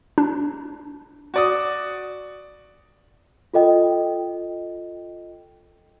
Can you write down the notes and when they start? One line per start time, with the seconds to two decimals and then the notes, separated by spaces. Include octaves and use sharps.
0.18 D4
1.34 F#4 D5 D#6
3.54 F4 A4 D#5 G5